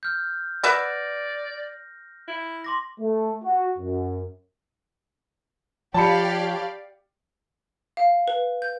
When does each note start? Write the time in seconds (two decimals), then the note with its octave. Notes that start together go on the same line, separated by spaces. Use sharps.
0.03 F6 G6
0.64 B4 D5 E5 F#5 A#6
2.28 E4
2.64 C6 D6 A#6
3.00 A3
3.44 F#4
3.78 F#2
5.94 F3 G4 C#5 D5 F5 A5 B5 C#7
7.97 F5
8.28 B4
8.62 G6